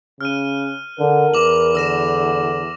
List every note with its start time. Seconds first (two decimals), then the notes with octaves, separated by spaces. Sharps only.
0.21 C#3 F6 F#6 D#7
0.99 D3 A#4
1.34 E2 D6 F7 F#7
1.75 D3 E6 A#6 E7